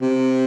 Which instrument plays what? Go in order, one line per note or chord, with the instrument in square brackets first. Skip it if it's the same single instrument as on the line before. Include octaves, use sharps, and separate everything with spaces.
[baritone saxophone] C3